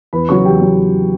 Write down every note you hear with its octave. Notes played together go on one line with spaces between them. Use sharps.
E2 B4 B5
C#3 F#3 C#5 C#6
E2 G4 G5
F#3